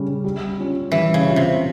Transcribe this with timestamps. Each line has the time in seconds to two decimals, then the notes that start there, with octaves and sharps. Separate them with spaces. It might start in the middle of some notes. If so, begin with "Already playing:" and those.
Already playing: C#3 G3 C#4
0.24 G3
0.58 C#4 F4
0.92 E3 G3
1.14 C#3
1.26 C#4 F4
1.36 C3